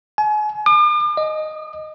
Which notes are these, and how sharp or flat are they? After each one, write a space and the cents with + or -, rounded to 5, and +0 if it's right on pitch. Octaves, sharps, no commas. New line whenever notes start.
G#5 +35
D6 +45
D#5 -5